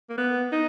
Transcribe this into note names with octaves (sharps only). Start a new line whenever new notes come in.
A#3
B3
D#4